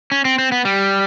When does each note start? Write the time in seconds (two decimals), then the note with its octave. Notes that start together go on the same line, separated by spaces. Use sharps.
0.12 C#4
0.25 C4
0.39 C4
0.52 B3
0.65 G3